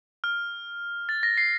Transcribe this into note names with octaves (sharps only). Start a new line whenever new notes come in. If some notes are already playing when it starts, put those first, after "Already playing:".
F6
A6
A#6
C7